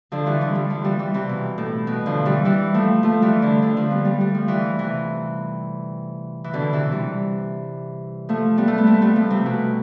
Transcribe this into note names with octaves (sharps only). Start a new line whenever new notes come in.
D3 F3
E3 G3
D3 F3
E3 G3
D3 F3
E3 G3
E3 G3
C3 E3
B2
A2
B2
D3 F3
E3 G3
E3 G3
F3 A3
F3 A3
E3 G3
D3 F3
D3 F3
F3 A3
G3 B3
G3 B3
G3
F3
E3 G3
C3 E3
E3
B2 D3
C3 E3
E3 G3
F3 A3
G3 B3
A3
B3
A3 C4
G3 B3
F3 A3
C3
B2